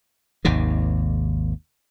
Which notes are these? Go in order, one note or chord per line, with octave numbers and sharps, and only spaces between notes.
G#1 D#2 C3 D#3